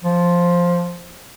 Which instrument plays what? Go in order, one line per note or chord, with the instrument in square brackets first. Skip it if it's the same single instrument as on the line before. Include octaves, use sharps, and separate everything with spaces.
[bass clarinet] F3